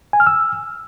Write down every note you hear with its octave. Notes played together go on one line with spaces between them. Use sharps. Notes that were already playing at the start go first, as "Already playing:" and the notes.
G#5
F6
E6